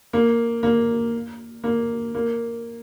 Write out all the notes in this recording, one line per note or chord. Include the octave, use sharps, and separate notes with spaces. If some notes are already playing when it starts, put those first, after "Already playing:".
A#3
A#3
A#3
A#3